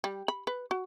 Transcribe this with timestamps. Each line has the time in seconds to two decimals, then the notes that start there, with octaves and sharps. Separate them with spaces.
0.04 G3
0.28 B5
0.47 B4
0.71 F#4